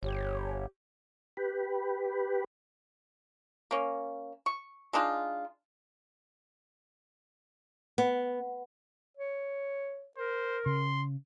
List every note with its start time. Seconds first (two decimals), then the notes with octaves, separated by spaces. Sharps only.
0.03 G1 G4 C#5
1.37 G4 B4
3.71 A#3 C#4
4.46 C#6
4.93 G#3 D4 D#4 F4
7.98 B3
9.17 C#5
10.17 A#4 C5
10.66 C#3 C6